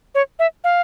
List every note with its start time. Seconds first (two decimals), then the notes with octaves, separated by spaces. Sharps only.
0.15 C#5
0.39 E5
0.64 F5